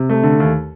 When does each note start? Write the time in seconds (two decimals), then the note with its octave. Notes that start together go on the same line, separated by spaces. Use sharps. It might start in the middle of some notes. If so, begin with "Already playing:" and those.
Already playing: C3
0.09 A3
0.23 D3
0.40 D#2